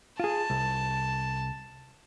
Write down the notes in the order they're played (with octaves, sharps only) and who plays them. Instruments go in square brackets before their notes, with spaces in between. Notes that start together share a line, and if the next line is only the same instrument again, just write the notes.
[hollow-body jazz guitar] F4 G#4 [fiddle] A5
[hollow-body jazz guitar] C2